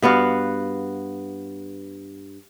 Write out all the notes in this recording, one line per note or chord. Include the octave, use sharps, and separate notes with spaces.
G2 B3 F#4 F5